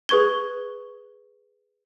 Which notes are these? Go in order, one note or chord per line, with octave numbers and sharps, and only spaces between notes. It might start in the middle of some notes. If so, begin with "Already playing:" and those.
G#4 B4 C#6 G#6 G7